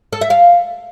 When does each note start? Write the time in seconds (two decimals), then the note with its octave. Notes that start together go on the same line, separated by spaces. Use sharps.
0.13 A4
0.21 E5
0.30 F5